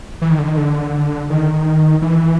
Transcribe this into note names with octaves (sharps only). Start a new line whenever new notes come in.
E3
D#3
D3
D#3
D3
D#3
E3